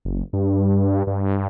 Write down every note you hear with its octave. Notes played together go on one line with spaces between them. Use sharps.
F#1
G2
G2